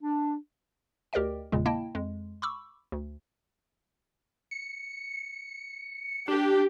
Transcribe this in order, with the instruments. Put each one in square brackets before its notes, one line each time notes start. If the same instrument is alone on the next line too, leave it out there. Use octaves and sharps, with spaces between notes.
[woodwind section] D4
[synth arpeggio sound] D2 G4 A#4 D5 D#5 G5
G1 E2 A#2 C#3 G#3
A#3 E4 D#5 G5 A5
F2 G#3
B5 C#6 D6 E6
D2
[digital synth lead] C#7
[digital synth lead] D4 [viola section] G4